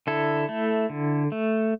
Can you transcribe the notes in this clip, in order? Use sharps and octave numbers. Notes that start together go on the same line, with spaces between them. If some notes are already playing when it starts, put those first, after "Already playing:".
D3 E4 A4
A3
D3
A3